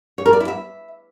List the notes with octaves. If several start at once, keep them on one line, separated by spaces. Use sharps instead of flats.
C#5
A#4
D5
E4
E5